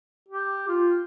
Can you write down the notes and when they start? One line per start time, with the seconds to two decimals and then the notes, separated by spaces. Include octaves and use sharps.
0.28 G4
0.68 F4